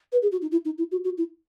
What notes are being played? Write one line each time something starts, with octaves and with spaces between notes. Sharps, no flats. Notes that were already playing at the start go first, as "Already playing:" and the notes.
B4
G#4
F#4
D#4
E4
D#4
E4
F#4
F#4
E4